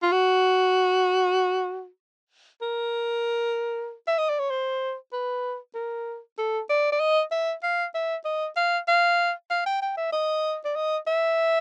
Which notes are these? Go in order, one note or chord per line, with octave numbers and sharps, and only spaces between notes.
F4
F#4
A#4
E5
D#5
D5
C#5
C5
B4
A#4
A4
D5
D5
D#5
E5
F5
E5
D#5
F5
F5
F5
G5
G5
E5
D#5
D5
D#5
E5